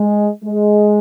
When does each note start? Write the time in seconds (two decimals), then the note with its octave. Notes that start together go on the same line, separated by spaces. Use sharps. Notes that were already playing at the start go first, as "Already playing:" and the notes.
Already playing: G#3
0.45 G#3